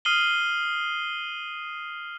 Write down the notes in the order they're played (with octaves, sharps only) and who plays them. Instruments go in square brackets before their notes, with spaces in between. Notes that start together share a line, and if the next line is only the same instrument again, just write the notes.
[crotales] D#6 F6 C7 D#7 F#7 G7